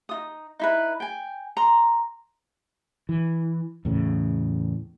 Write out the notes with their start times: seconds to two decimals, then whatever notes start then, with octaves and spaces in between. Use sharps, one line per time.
0.09 D#4 F4 D#6
0.59 D#4 E4 B4
1.00 G5 G#5
1.57 A#5 C6
3.09 E3
3.85 E2 A2 C#3